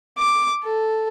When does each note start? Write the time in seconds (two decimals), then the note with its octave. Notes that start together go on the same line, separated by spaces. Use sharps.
0.18 D6
0.64 A4